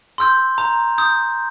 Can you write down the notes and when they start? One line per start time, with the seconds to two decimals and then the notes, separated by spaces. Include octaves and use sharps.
0.18 C6 E6 G6
0.58 A#5
0.98 D#6 G6